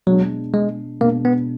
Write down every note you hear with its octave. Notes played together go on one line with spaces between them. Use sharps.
B2 F#3 G#3 D4
G#3
B2 G#3 A#3 D4
B3